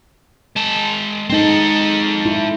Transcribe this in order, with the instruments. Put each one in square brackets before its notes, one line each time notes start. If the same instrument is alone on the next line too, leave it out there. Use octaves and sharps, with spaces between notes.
[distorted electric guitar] G#3 A5
[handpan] G#3 D#4 [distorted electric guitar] C4 A4
[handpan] E4